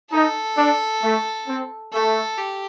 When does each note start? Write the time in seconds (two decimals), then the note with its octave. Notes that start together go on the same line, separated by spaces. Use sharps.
0.11 D#4 A4
0.57 D4
1.02 A3
1.47 C4
1.92 A3 A4
2.37 G4